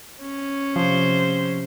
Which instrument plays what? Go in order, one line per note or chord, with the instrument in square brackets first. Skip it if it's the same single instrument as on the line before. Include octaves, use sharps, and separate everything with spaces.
[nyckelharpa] C#4
[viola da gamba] C3 C5 [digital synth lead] F3